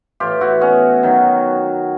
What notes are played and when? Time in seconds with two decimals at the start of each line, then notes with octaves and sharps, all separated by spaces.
0.20 A2 E3 F4 G4
0.41 E4 F#4
0.61 B3 C#4
1.03 D#3 F#3